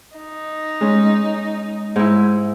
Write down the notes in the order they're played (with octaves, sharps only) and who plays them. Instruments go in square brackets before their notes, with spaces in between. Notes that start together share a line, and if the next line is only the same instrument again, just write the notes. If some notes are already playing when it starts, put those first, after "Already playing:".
[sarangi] D#4
[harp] G#3 C#4
G#2 E4